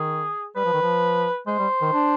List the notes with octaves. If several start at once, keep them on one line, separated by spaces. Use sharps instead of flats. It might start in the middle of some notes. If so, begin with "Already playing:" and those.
Already playing: D#3 G#4
G3 B4
F3
D#3
F3
G#3 C5
G3
D#3
D4